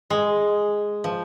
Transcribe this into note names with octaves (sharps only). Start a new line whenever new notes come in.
G#3
F3